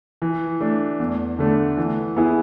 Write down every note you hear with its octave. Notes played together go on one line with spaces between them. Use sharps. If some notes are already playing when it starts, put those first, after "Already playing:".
E3
A3 D4
E2
D3 A3 D4
E3
B3 E4 G#4